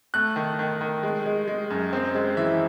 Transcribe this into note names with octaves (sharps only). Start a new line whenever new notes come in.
A3 F#6
D#3
D#3
D#3
G#3
G#3
G#3
F#2
C4
G#3
E3 E5